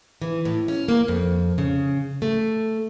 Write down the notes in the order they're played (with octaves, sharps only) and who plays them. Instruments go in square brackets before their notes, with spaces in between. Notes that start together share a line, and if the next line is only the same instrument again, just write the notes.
[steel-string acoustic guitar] E3
A2
C#4
A#3
F2
C#3
A3